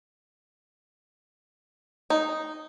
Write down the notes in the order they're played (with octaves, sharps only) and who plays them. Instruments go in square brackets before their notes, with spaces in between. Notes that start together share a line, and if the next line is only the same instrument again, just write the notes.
[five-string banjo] D#4